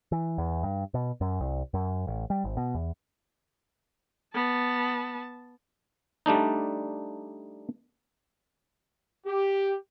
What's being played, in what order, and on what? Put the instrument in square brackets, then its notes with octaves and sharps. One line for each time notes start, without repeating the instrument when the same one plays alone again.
[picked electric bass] E3
E2
G2
B2
F#2
C2
F#2
A1
G3
G#1
B2
E2
[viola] B3 A5
[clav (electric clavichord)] G3 A3 D4 D#4
[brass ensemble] G4